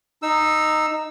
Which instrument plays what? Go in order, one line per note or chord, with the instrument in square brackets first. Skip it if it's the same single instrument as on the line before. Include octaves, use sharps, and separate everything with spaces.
[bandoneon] D#4 E6